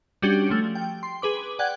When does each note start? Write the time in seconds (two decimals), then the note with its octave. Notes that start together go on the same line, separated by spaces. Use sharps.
0.22 G3 C#4 D4 F#4 G4
0.50 F3 A3
0.75 G5
1.03 C6
1.22 G#4 B4 D6
1.59 D5 F#5 G5 F#6 G#6